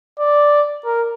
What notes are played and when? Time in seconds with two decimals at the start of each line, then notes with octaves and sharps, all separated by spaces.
0.19 D5
0.85 A#4